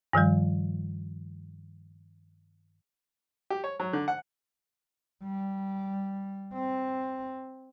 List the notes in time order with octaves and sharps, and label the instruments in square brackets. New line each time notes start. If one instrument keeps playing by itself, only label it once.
[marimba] G2 D#3 F3 G3
[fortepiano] G4
C#5
F#3
D3
F#5
[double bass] G3
C4